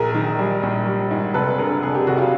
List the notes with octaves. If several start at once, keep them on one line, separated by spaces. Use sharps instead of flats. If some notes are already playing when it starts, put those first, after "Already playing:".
Already playing: A#1 G#4 A#4
D#3
G3
A#1
G3
G#2
F1 A4 B4
D3 G#4 A#4
F1 G#4
G4
F1 F#4
F4 G4